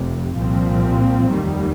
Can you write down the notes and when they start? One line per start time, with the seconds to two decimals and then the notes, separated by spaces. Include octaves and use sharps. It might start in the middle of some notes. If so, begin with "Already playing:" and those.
Already playing: F1 F2 C3
0.34 C2 A#2 F3 C4
1.31 F1 D#2 D#3 G3